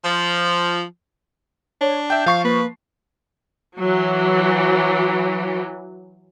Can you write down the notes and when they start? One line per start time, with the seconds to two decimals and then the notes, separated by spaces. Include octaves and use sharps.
0.04 F3
1.81 D4 C#5
2.10 E5 G5 G6
2.26 F3 F5 C#6 C7
2.44 A#3 B4
3.80 E3 F#3